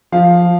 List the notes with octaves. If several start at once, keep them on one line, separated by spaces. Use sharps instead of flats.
F3 F5